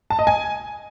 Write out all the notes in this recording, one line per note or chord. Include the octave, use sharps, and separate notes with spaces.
A5
D#5
G#5